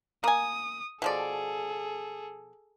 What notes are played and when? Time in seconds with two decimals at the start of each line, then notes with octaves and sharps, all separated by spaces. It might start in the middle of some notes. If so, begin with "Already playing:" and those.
0.24 A#3 G#5 D#6
1.02 B2 F3 G#4 A4 D5